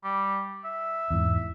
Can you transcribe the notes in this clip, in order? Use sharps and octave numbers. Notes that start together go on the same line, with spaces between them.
G3
E5
E2 G#2